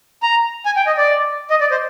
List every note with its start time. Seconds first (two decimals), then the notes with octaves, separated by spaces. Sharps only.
0.23 A#5
0.65 G#5
0.76 G5
0.87 D#5
0.97 D5
1.50 D#5
1.61 D5
1.71 C5